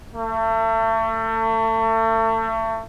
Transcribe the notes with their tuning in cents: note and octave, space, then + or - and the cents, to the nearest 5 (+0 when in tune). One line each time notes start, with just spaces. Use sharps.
A3 +35